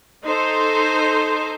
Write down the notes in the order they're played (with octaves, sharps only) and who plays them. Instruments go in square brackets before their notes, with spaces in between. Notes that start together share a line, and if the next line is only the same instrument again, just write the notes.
[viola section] D#4 A4 C5